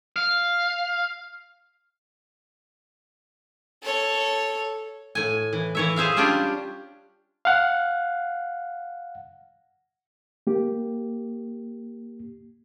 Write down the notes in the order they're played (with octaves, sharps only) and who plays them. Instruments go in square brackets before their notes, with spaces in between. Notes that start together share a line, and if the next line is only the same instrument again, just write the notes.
[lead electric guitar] F5
[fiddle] A4 C#5
[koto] A2 G#5
E3
E3 C#5 E5
G#4 C5 E5 F5
G3 C#4 D4 F4 G4
[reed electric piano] F5 F#5
A#3 G4